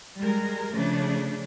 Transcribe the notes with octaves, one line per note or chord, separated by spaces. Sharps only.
G3 G#3 A#4
C#3 F3 A3 D4